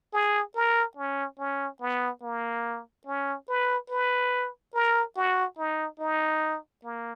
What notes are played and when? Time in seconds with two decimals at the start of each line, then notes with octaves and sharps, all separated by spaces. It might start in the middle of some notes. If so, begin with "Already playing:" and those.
0.13 G#4
0.55 A#4
0.97 C#4
1.39 C#4
1.80 B3
2.22 A#3
3.06 C#4
3.48 B4
3.90 B4
4.74 A#4
5.16 F#4
5.58 D#4
5.99 D#4
6.84 A#3